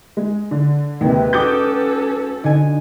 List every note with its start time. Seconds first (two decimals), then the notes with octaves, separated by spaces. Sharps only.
0.17 G#3
0.51 D3
1.01 D#2 C3 G#3 B4
1.33 C#4 F#4 A4 G5 D6 D#6 G6
2.44 D3 D#4 G#5